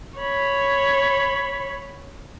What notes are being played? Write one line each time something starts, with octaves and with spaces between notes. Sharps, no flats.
C#5 B5